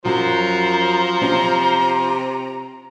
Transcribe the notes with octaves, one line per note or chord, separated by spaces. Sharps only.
F#2 F3 F#3 C5 A#5
C3 C#4